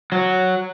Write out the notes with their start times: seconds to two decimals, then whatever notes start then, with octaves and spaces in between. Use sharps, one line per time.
0.12 F#3